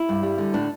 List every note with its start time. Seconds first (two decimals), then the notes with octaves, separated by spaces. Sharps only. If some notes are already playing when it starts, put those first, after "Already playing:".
Already playing: E4
0.09 G2
0.23 G3
0.38 D3
0.53 A2 D4